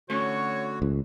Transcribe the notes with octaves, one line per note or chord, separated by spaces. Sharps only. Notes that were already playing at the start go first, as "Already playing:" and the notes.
D3 A3 C#4 F#4 C#5
C#2